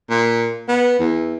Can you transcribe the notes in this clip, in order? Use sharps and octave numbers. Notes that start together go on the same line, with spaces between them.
A#2
B3
E2